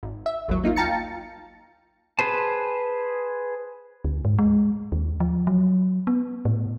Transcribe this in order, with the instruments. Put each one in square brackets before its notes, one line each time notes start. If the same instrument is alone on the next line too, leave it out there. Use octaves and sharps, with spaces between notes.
[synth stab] G#1
E5
A1 D#2 F#3
A#3 D#4 F4
F5 G5 A5 A#5 A6 C#7
[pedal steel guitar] G#4 B4 C5 A5
[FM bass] D2
G#2
G#3
D#2
F3
F#3
B3
A2